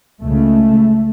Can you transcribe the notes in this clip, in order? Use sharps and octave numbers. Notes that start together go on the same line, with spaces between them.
C#2 C#3 A3